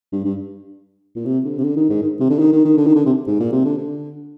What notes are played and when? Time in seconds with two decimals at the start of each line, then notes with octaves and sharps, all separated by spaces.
0.12 G2
0.25 G2
1.16 A#2
1.25 C3
1.44 D3
1.58 C3
1.63 D3
1.76 D#3
1.89 G#2
2.01 D#3
2.20 C3
2.30 D3
2.39 D#3
2.52 D#3
2.65 D#3
2.77 D3
2.86 D#3
2.95 D3
3.05 C3
3.27 G#2
3.39 A#2
3.52 C3
3.64 D3
3.78 D3